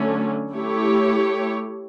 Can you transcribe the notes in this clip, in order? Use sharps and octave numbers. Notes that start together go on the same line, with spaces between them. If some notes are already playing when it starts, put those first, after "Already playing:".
Already playing: D3 F#3 A3 C#4
A3 E4 G4 C#5